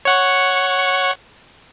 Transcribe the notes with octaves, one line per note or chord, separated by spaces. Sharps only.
C#5 F#5 C#6